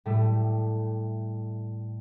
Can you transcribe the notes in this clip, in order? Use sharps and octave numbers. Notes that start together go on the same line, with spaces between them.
A2 G3 A3